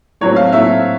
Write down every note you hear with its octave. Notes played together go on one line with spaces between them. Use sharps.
A2 F#3 A3 C4 C#5
F5
A2 F#3 A3 C4 E5